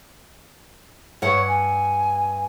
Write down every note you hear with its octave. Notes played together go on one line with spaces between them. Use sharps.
G2 C#5 F#5
G#5